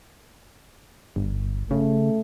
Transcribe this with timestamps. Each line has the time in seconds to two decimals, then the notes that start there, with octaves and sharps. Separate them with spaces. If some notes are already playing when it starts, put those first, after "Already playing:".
1.16 G1
1.71 C#3 A3